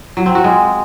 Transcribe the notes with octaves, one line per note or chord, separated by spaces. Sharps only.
F#3
C4
F#4
G#3